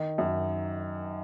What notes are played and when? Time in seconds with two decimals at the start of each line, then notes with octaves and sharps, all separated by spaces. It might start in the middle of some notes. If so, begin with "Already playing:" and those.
Already playing: D#3
0.18 F#2